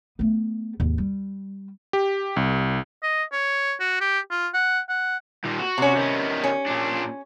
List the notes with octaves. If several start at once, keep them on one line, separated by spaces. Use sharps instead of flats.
A3 B3
D#2 G#2
G3
G4
C2
D#5
C#5
F#4
G4
F4
F#5
F#5
D#2 A#2
F#4
C3 C#4
D#3 B3
C#4
A#2 D4